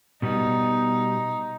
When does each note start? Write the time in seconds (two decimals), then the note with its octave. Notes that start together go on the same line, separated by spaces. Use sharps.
0.22 B2 G3 B3 D#4